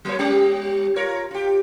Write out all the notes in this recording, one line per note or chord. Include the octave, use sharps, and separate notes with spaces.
F#3 A#3 C#5
G3 C#4 G4
F4 A#4 C#5
F4 G4